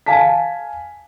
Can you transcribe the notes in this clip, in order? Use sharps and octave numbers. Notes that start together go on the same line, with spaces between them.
F5 G#5 A5 B6